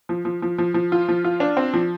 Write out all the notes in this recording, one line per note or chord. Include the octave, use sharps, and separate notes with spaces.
F3
F3
F3
F3
F3
F4
F3
F4
D4
C4
F3